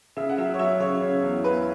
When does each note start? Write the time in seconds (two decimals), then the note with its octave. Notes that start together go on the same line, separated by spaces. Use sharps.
0.17 C#3 E5
0.29 F#5
0.38 F#3 E5
0.54 C#5
0.59 F#3 E5
0.80 C#3 C#5
1.01 C#3
1.23 E2
1.44 E2 B4